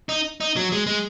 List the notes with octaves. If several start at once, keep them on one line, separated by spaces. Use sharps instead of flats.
D#4
D#4
F#3
G#3
G#3